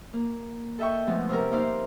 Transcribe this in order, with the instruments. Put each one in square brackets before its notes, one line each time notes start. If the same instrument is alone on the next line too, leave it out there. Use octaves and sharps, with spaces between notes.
[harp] A#3
A4 D#5 E5 G5 C#6
B2 D3 F3 G#3 A3 B3
C3 G3 C#4 A#4
A#3 D#4 E4 C5 D5 F5